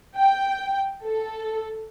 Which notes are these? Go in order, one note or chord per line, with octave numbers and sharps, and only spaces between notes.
G5
A4